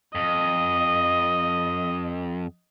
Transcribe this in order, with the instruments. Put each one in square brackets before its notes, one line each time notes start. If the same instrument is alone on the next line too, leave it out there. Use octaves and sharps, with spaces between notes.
[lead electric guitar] F2 [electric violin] D#5